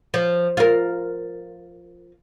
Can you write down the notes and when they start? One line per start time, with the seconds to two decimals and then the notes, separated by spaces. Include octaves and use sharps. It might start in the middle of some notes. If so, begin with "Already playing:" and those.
0.14 F3
0.57 F4 A#4